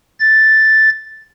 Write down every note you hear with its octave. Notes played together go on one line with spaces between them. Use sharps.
A6